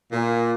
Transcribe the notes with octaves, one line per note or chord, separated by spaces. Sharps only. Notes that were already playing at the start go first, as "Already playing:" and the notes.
A#2